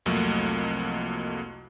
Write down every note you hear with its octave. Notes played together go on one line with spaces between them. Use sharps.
C2 F2 F#3 A3 A#3